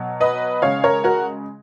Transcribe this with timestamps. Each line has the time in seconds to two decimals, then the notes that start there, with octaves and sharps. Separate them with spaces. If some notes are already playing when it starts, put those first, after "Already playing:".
Already playing: B2 F#3
0.20 B4 D#5
0.62 C#3 G#3 C#5 F5
0.84 A#4 C#5
1.04 F#4 A#4